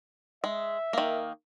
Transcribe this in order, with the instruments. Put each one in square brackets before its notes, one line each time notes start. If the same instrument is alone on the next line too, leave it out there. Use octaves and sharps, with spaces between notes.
[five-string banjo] G#3 [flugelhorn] E5
[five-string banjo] D#3 A#3